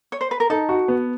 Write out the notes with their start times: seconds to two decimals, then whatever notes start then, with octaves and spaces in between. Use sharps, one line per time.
0.12 C#5
0.21 C5
0.31 B4
0.40 A#4
0.50 D#4 A4
0.69 F#4
0.88 B3